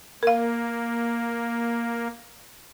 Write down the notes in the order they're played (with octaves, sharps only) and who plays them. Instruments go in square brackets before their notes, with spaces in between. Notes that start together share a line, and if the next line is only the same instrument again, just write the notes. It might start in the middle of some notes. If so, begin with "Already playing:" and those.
[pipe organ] A#3 [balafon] A#4 F5